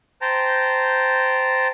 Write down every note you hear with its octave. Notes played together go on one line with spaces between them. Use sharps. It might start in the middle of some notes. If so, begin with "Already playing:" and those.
C5 G5 A5 A#5